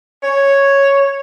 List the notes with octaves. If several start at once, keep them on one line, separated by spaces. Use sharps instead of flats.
C#5